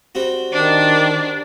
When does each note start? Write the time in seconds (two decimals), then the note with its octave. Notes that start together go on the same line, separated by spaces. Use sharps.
0.15 G3 C4 F#4
0.53 D#3 D4